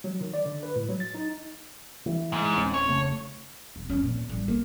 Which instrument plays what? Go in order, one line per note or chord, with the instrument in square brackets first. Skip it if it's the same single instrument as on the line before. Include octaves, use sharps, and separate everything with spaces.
[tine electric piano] F#3
D#3
D5
D3
B4
A2
F#3
A6
D#4
[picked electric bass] E3
[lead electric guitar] G#2
[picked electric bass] D1 C4 C#4
[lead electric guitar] C#5
[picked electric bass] F1 C#3 A3
[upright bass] E1
F2 C#4
A#2
A1 G3
A#3